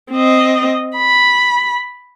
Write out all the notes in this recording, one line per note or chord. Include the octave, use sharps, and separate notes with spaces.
C4 D#5
B5